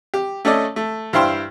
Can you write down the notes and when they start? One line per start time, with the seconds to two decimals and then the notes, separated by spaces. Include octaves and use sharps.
0.14 G4
0.45 A3 C#4 A4 D5 D#5
0.76 A3
1.13 G2 E4 C5 F5 G5 C6